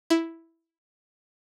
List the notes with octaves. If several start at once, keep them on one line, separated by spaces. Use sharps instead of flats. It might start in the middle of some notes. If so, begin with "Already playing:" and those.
E4